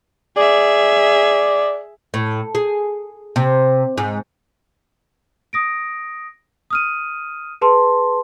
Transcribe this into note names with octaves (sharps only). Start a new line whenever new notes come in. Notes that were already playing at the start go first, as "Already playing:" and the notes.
G#4 D5 E5
A2
G#4
C3
G#2
D#6 A#6 D7
D#6 F6 D#7
G#4 B4 A5 C6